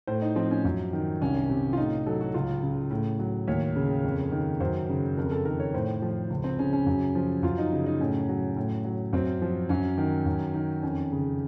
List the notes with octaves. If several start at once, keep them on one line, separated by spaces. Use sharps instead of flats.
A2 C5
D#4
F3 C4
C#4
F#2
D#3
C2 C#4
C3
F4
A2 D#4
F#3 A4
F#4
C#2 F4
C#3
A2
F#3
D#2 C#5
C#3
F2
D#3
F#2 C5
C#3
F2 A#4
A4
D#3 A#4
C#5
A2 C5
F3
C#2
C4
C#3 C#4
C#4
F#2
F3
F#2 F4
D#4
C#3
D#4
A2 C#4
F#3
A2
F#3
F#2 C4
F3
F#2 C#4
D#3
F#2
D#3
F2 C#4
C#3